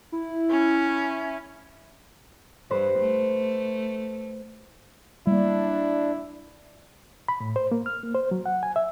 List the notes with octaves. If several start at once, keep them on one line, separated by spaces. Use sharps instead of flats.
E4
C#4
G2 B4 C5
A3
G3 A#3 D4 E4
B5
A2
C5
A#3
F6
A#3
C5
F#3
F#5
G#5
E5